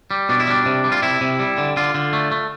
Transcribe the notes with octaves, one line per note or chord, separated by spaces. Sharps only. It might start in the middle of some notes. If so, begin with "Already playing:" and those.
G3
B2 D4
E4
G3 D4
C3
G3
F4
C3 E4
C3
G3
D3
D3 F4
D3
A3
A3